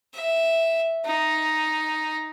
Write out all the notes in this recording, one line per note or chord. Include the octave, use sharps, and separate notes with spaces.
E5
D#4